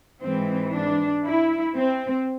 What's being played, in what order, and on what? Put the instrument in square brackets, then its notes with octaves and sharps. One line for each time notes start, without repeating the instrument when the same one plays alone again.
[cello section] G#2 E3 G#3 C4
D4
E4
C4